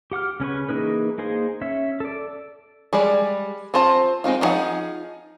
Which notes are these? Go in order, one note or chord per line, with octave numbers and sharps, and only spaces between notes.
G4 F#5 D6 F6
C#3 C#4 B4 C#6
E3 A#3 D#4 G#4 B4
A#3 D#4 G#4 C5
C#4 C#5 E5
A4 D5
G3 G#3 G#4 D5
C4 F4 C5 A5
G#3 C4 D#4 F4
F3 B3 D#4 G#4 F#5